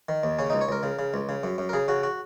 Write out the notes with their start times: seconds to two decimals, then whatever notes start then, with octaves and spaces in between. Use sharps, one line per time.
0.09 D#3
0.23 D#2
0.39 C#3 C#4
0.50 C#2 D#4
0.61 C#5
0.69 C#2 A#4
0.83 C#3
0.99 C#3
1.14 C#2
1.29 C#3
1.43 F#2
1.58 F#2
1.69 A#4
1.73 C#3 G#4
1.88 C#3 F#4
2.03 F#4